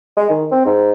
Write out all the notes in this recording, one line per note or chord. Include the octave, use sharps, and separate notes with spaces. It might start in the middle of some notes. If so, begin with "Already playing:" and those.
G#3
D#3
C4
G#2